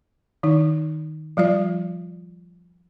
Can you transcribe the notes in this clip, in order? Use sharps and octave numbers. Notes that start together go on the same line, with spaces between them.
D#3 D#4
F3 G3 F4 D5